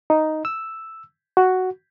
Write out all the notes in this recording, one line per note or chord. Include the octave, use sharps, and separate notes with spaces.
D#4
E6
F#4